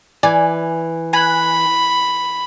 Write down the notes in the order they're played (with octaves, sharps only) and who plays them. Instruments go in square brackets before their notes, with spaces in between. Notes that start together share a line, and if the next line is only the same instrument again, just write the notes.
[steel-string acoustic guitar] E3 [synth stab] D5 G#5
[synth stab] G#5 F#6 [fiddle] B5